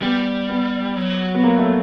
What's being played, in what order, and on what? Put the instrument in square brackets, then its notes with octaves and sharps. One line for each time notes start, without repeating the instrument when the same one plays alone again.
[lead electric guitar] G3 [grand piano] B3
[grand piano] B3
[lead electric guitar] F#3
[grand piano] B3
A#3
A3